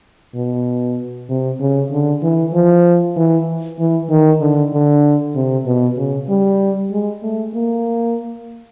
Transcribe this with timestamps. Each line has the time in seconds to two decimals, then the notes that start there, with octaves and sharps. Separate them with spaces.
0.35 B2
1.29 C3
1.60 C#3
1.91 D3
2.22 E3
2.53 F3
3.17 E3
3.79 E3
4.10 D#3
4.41 D3
4.73 D3
5.35 C3
5.66 B2
5.97 C#3
6.29 G3
6.91 G#3
7.23 A3
7.54 A#3